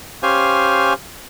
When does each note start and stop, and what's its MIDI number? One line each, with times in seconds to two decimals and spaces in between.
0.23 0.93 61
0.23 0.93 67
0.23 0.93 72
0.23 0.93 77
0.23 0.93 80